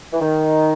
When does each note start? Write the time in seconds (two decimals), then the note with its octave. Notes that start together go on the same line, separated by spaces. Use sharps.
0.13 E3
0.21 D#3